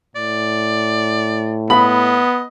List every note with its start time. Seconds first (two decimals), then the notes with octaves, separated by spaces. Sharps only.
0.16 A2 D5
1.70 B3 D#5 B5